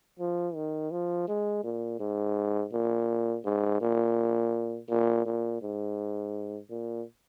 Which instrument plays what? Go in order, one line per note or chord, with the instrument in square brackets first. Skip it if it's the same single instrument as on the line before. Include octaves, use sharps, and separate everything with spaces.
[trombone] F3
D#3
F3
G#3
A#2
G#2
A#2
G#2
A#2
A#2
A#2
G#2
A#2